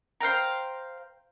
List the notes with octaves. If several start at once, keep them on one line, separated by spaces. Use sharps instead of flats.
C5 F5 G5 A#5